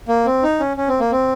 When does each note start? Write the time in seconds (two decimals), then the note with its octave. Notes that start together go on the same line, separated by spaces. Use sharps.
0.08 A#3
0.26 C4
0.43 D#4
0.60 C#4
0.77 C#4
0.88 C4
1.00 A#3
1.12 C4